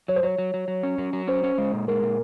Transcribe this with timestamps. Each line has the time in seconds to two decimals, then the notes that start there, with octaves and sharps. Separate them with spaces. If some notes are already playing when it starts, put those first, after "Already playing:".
0.08 F#3 C#5
0.16 C5
0.23 F#3 C#5
0.38 F#3
0.54 F#3
0.68 F#3
0.83 C#4
0.98 F#3
1.13 F#3
1.28 C#4 C5
1.44 C#4
1.58 G#3
1.73 A#2
1.88 G#3 A#4
2.03 A#2